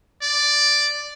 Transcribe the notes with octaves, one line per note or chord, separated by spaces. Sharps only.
D5